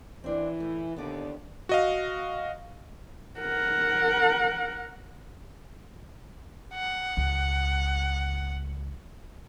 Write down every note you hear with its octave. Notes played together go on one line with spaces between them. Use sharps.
E3 C4 D4
A2
D#2 D3 B3 D5
F#4 D#5 F5
A#4 F#5
F#5
C#2